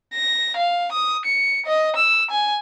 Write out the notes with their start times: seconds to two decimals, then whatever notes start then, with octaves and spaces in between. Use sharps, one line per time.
0.14 A#6
0.56 F5
0.92 D#6
1.25 C#7
1.66 D#5
1.96 E6
2.31 G#5